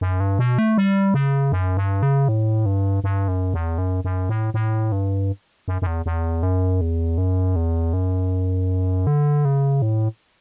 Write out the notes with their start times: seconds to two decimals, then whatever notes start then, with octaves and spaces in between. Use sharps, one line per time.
0.01 F#2
0.20 G2
0.39 B2
0.58 A3
0.78 G3
1.14 C#3
1.52 F#2
1.77 G2
2.03 C#3
2.28 A2
2.66 G2
3.04 G2
3.28 F#2
3.54 E2
3.78 F#2
4.04 F#2
4.29 A2
4.54 A2
4.92 G2
5.68 F#2
5.82 F#2
5.86 E2
6.06 E2
6.43 F#2
6.81 E2
7.18 F#2
7.56 E2
7.93 F#2
9.07 D3
9.45 C#3
9.82 A2